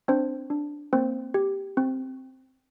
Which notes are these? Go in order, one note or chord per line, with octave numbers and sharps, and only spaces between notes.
C4 D4 C5
D4
A#3 C4 C5
G4
C4